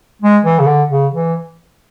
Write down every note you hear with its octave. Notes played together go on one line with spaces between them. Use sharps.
G#3
E3
C#3
D3
C#3
E3